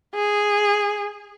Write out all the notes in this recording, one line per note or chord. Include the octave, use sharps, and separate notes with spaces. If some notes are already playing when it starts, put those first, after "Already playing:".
G#4